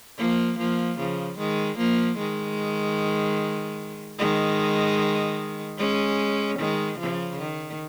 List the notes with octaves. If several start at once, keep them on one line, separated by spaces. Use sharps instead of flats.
F3 A#3
F3 A#3
C#3 F3
D#3 G#3
F3 A#3
D#3 G#3
D#3 G#3
G#3 C#4
D#3 G#3
C#3 F3
D#3